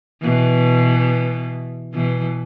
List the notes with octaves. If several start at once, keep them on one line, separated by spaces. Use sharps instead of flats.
B2 E3
B2 E3